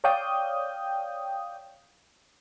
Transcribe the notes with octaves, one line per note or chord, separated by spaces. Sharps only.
C#5 D5 F5 G5 D#6 G6